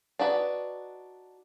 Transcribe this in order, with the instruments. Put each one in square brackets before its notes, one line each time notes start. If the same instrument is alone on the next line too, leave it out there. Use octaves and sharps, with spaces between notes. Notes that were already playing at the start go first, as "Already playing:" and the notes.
[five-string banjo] D4 D#4 F#4 B4